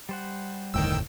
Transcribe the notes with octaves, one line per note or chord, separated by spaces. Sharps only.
G3 C5 F#5
F1 D2 A2 D#3 G5 E6